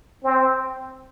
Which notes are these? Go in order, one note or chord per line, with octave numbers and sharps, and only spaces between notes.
C4